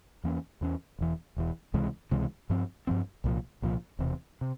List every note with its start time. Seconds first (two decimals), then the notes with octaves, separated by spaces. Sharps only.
0.24 E2 E3 A#3 C#4
0.61 E2 E3 A#3 C#4
0.99 E1 E2 E3
1.37 E1 E2 E3
1.74 C#2 C3 E3 G#3
2.11 C#2 C3 E3 G#3
2.50 G2 F3 C4
2.87 G2 F3 C4
3.24 C2 A#2 F3
3.62 C2 A#2 F3
3.99 E1 E2 C3
4.41 C3